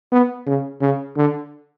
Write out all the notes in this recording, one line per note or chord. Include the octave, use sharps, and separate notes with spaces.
B3
C#3
C#3
D3